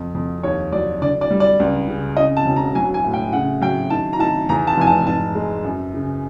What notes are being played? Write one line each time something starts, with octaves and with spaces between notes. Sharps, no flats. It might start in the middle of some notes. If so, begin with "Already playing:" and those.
Already playing: F2
F2
D#2 C#5
F#3 D5
D3 D5
D5
G3
D5
C#2
C#3
C#3 D#5
A5
E1
A#5
F#3 G#5
G#5
A2
G5
C#3 F#5
F#3 G5
D#3 A5
A#5
D#3 A5
E2 A#5
A5
F1 G#5
A5
G#2 A5
G#3
F#2
C#3